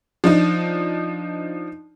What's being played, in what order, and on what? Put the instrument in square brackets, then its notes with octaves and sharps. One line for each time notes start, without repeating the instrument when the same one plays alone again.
[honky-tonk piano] F3 D4 D#4